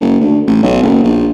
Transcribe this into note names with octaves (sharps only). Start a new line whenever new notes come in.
F#1
D2
A1
B1
F#1
A#1